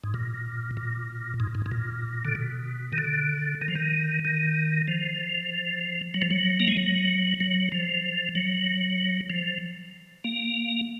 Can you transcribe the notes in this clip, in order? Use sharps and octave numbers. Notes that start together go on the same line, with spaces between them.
G#2
A#2
A#2
G#2
G#2
G#2
A#2
D3
B2
D#3
D3
D#3
F3
D#3
D#3
F3
F#3
F3
F#3
A#3
G#3
F#3
F#3
F3
F#3
F3
A#3